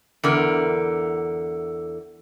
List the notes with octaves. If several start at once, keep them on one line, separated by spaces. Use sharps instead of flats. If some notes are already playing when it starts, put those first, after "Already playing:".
E2 D3 A#4